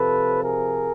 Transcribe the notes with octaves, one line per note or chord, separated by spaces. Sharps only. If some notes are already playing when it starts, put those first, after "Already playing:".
Already playing: C3 F3 A4 B4
G#4 A#4